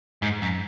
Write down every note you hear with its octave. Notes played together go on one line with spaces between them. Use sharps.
G#2
F#2